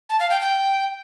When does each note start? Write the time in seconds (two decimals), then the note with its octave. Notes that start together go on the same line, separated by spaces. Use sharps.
0.09 A5
0.20 F5
0.30 G5
0.41 G5